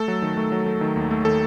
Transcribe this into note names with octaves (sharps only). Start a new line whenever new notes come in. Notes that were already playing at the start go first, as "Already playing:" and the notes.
Already playing: A3 A4
F#3
D#3
A3
F#3
A3
D#3
D#2
A3
D#3 A4